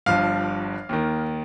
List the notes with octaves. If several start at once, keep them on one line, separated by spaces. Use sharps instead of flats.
G1 G2 F3 F5
D#2 D#3